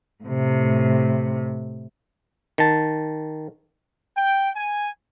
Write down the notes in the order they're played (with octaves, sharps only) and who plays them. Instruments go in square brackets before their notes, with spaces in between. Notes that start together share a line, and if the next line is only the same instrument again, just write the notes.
[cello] A2 C3
[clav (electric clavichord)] D#3 A5
[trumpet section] G5
G#5